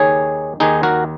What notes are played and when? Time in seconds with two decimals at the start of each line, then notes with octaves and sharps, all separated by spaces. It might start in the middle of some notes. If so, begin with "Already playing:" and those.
Already playing: D#2 D#3 G#4 C#5
0.60 D#2 D#3 D#4 G#4
0.83 F#4 A#4